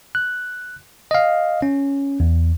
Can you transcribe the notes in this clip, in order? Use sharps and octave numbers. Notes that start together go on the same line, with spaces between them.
F#6
D#5 F5
C#4
E2